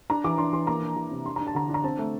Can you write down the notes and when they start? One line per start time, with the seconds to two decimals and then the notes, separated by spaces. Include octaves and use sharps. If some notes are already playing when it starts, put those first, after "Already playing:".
0.10 D4 A#5
0.24 E3 D6
0.38 D4 C6
0.53 E3 C6
0.67 A#3 A#5
0.83 D4
0.96 E3
1.11 C3
1.26 D4 C6
1.36 D4 A#5
1.47 A5
1.55 D3 A#5
1.69 D4 A#5
1.84 C4 A5
1.99 A3